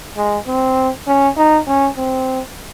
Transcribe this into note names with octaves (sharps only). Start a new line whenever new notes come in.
G#3
C4
C#4
D#4
C#4
C4